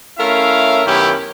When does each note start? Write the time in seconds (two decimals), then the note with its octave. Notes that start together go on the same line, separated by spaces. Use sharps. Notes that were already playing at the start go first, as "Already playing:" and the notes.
0.18 A3 C#4 E4 A#4 E5 F5
0.86 F#2 D#3 B3 C#4 E4 G4